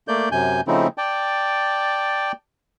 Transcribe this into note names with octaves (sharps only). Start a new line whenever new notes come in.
A3 A#3 D5 G6
F#2 C3 G#5 G6
C#3 F3 A3 C4 D#4 E4
D5 G5 A5